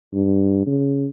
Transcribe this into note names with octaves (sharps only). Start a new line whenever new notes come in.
G2
C#3